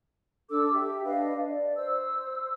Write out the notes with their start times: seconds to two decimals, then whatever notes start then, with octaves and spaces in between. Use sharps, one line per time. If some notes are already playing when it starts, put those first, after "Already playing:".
0.50 D4 A4 D6 E6
0.74 G4 E5
1.05 D4 B4 D#5 F5
1.45 D5
1.77 C5 E6